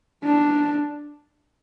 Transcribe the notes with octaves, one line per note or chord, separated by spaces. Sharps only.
D4